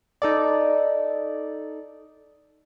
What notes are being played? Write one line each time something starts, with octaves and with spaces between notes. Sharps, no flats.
D#4 A4 D5